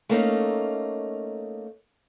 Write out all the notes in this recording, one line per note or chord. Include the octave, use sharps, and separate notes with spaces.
A3 A#3 C#4 D#4